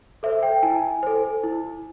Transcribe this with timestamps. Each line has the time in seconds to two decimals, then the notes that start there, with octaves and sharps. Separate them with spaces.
0.23 A4 C5 E5
0.43 G5
0.63 E4 G#5
1.03 A4 C5
1.44 E4